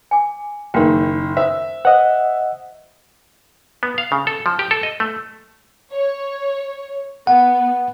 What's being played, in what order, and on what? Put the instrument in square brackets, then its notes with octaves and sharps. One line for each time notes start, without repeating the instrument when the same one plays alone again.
[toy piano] G#5 D6
[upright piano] F#1 D#3 [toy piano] A#4 G5
[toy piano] C5 D#6 [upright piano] E5
[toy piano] C5 [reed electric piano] D#5 F#5
[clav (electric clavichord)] B3
F5
C#3
A4
F3
G4
A4
D#5
A3
[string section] C#5
[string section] B3 [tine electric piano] F#5